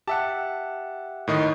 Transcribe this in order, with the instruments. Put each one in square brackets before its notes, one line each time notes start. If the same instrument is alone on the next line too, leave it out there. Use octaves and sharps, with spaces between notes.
[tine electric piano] G4 E5 F#5 [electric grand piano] A5
[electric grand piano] A2 D#3 D#5